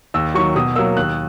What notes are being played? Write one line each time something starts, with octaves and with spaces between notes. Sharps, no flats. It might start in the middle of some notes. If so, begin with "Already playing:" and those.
D#2 E6
D#3 F#3 C#6
B2 D#6
F#3 A#3 E6
D#2 F#6